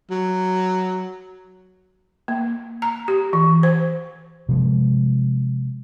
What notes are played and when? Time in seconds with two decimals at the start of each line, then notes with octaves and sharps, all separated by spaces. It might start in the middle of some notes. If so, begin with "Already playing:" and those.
0.10 F#3
2.28 A#3
2.82 A#5
3.08 G4
3.33 E3
3.63 C5
4.49 C3 F3 G#3